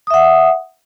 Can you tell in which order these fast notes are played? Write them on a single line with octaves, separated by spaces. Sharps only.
D#6 E5 F#5